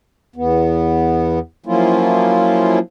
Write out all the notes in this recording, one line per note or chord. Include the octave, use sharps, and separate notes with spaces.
E2 B3
F3 F#3 A#3 C#4 E4 F4